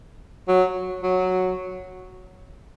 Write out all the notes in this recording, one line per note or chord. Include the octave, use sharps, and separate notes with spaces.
F#3
F#3